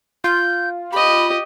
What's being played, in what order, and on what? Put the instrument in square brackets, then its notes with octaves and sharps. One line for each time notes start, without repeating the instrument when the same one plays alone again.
[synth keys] F4 [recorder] G6
[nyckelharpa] G4 D#5 [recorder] B5